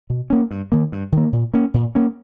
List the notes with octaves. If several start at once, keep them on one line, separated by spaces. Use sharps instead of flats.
B2
A#3 C#4
G2
D#3 A#3
G2
D#3 A#3
A#2
A#3 C#4
A#2
A#3 C#4